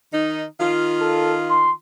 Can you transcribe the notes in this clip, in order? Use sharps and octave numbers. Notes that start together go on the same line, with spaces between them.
D#3 D#4
D#3 F4
A4
C6